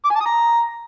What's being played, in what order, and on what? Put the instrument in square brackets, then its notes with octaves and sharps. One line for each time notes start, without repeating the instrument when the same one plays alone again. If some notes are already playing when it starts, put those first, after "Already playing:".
[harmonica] D6
G#5
A5
D#6
A#5